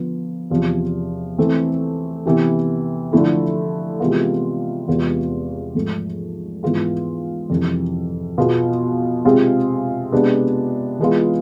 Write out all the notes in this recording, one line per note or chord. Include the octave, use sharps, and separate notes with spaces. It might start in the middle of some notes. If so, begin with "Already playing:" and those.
Already playing: D3 F3 B3
E2 C3 F3
E3 A3 C4
C3 E3 B3
D3 F3 A3 E4 A4
C3 E3 G#3 B3 F4
E2 C3 G#3 B3 F4
G#2 F3 A3
G#2 E3 B3 F4 G#4
F2 C3 E3
B2 B3 F4 G#4
C3 G#3 C4 F4 G#4
C3 G#3 B3 D4
E3 G#3 B3 F4